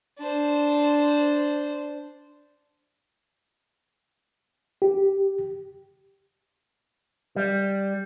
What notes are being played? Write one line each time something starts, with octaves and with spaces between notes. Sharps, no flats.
D4 C5
G4
G3